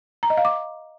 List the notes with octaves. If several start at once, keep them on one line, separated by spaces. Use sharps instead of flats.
A#5
D#5
F5
D6